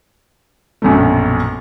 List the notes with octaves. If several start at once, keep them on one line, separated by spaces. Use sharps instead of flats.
A#1 F#2 B2 A3